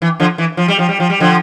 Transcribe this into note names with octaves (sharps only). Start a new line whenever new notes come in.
E3
D3 F3
E3
F3
G3
F3
G3
F3
G3
D3 F3